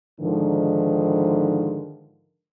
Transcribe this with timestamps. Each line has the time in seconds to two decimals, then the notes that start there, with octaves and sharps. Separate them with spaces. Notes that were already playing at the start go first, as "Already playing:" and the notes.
0.21 G#2 D3 D#3 F3